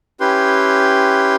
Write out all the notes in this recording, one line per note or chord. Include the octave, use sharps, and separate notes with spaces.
C#4 E4 G4 B4 G5 C6